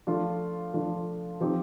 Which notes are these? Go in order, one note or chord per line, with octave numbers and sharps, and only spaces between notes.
F3 A3 D4 F4
F3 A3 D4 F4
F3 C4 D#4 G4